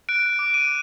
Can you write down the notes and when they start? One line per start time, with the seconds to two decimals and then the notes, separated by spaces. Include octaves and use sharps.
0.09 F#6 D7
0.39 D6
0.54 D#7